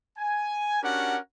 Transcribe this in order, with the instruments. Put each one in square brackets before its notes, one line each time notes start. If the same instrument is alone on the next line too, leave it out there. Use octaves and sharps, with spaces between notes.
[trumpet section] G#5
C#4 D4 F#4 G4 A#4 F#5